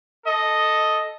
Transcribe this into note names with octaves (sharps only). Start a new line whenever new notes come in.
A4 D#5